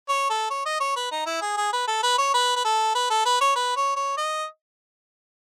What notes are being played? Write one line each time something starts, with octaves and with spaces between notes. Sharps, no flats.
C#5
A4
C#5
D#5
C#5
B4
D#4
E4
G#4
G#4
B4
A4
B4
C#5
B4
B4
A4
B4
A4
B4
C#5
B4
C#5
C#5
D#5